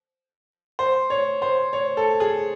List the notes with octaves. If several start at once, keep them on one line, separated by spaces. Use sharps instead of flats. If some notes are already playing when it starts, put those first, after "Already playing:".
C5
C#5
C5
C#5
A4
G#4